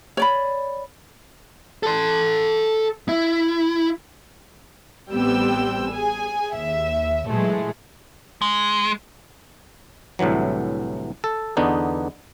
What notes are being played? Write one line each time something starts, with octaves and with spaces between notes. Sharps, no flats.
C#5 D5 B5
A4 C6
E4
A1 G3 B3 C4 G5 E6
G#4 G#5
D#2 E5
A#2 E3 F#3 G#3 A3
G#3
C2 A2 D3 E3 F#3
A4
E2 D3 B3 D4 D#4